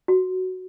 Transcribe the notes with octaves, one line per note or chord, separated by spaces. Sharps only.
F#4